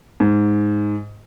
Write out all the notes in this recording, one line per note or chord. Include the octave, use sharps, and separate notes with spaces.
G#2